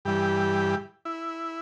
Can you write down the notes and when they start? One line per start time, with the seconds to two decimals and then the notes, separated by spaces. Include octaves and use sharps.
0.05 G2 E3 G3 G4
1.05 E4